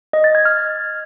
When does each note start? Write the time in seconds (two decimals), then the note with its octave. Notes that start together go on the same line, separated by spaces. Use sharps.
0.13 D#5
0.24 A6
0.35 G#6
0.45 F6